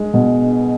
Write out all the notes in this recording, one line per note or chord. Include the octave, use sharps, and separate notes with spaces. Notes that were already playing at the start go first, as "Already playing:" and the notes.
Already playing: G#3
B2